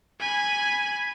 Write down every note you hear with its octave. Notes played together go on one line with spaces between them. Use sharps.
G#5 B5